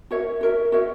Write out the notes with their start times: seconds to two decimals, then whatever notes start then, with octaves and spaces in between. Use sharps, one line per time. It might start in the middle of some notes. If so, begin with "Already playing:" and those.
0.11 F#4 A#4 C#5 E5
0.41 F#4 A#4 C#5 E5
0.72 F#4 A#4 C#5 E5